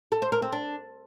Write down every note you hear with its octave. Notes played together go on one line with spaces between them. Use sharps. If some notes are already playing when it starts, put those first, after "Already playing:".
A4
C5
A#4
C4
D4